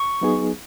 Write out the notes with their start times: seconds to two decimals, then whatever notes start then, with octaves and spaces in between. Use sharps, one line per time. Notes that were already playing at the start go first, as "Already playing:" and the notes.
Already playing: C#6
0.21 F#3 B3 D#4 G#4